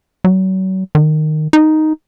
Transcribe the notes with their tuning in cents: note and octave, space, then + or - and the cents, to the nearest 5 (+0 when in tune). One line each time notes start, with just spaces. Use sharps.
F#3 +35
D#3 -15
D#4 +0